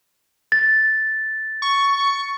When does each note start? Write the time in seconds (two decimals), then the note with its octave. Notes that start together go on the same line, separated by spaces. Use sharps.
0.52 A6
1.62 C#6